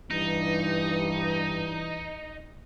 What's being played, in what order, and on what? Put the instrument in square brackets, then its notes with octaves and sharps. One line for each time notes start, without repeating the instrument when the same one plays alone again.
[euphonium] G2 [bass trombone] E3 [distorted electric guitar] D#4